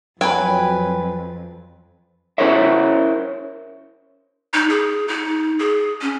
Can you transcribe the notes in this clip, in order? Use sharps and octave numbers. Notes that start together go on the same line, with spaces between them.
F2 F#3 B4 G5 G#5
C#4 E4 A#4 C5 C#5 E5
D#4
G#4
D#4
G#4
C#4